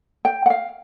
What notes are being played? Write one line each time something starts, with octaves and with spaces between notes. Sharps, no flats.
G5
F#5
F5